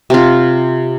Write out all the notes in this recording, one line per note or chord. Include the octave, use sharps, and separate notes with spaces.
C3 F4